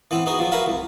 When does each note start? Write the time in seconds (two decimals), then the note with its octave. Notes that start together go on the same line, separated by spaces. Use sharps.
0.11 E3 B3 C4
0.26 B3 D#4 F#4 G#4
0.39 F3 F#3
0.52 F#4 A#4 B4 E5 F5
0.66 C2